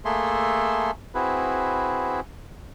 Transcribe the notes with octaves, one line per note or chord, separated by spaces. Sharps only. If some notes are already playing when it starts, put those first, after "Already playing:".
A3 A#3 G#4 A4 E5 C6
C4 E4 F#4 G#4 B4